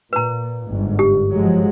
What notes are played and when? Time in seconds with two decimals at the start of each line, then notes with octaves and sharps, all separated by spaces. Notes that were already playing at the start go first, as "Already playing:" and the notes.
0.13 A#2 B4 A#5
0.69 G1 G#2
0.99 G4
1.34 F3 F#3 G#3